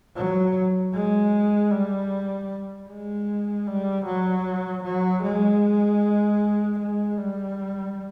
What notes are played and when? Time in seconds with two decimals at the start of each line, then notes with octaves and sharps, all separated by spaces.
0.17 F#3
0.94 G#3
1.72 G3
2.89 G#3
3.67 G3
4.06 F#3
4.84 F#3
5.23 G#3
6.79 G#3
7.18 G3